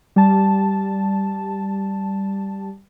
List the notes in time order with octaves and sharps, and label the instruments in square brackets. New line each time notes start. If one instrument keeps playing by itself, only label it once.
[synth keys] G3 A5